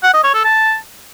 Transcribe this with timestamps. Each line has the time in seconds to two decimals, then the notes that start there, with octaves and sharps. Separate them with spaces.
0.03 F#5
0.13 D#5
0.24 C#5
0.34 A4
0.44 A5